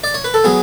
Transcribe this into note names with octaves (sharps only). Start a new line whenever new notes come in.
D5
C#5
B4
A4
F#3 B3 G#4